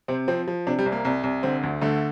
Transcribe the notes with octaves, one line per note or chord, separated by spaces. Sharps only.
C3 C4
F3 C4
F3
C3 D4
G3
C2
A#3
C2
C2
D3 C4
D2
D3 A3